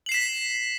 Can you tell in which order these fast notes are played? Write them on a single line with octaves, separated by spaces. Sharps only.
F#7 C7 E7 B6